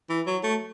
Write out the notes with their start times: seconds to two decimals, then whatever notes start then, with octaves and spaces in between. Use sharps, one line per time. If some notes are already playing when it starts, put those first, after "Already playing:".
0.10 E3
0.27 F#3
0.43 A3